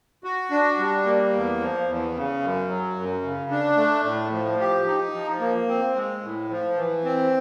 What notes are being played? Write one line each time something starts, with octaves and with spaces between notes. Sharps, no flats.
F#4
D4
G3
A#3
E2
F3
E2
C#3
F#2
F#3
F#2
C#3
D4
A3
A2
F3
G4
D#4
F3
A#3
C4
G#3
A2
F3
E3
C4